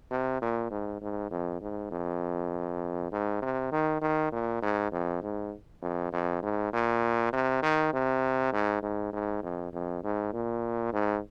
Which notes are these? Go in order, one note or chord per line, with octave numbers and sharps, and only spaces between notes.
C3
A#2
G#2
G#2
F2
G#2
F2
G#2
C3
D#3
D#3
A#2
G#2
F2
G#2
F2
F2
G#2
A#2
C3
D#3
C3
G#2
G#2
G#2
F2
F2
G#2
A#2
G#2